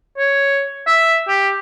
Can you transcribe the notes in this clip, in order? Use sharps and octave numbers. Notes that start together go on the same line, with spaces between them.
C#5
E5
G4